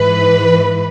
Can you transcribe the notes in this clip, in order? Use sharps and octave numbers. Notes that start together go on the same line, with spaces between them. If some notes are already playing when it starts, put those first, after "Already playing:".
Already playing: G#2 E3 B4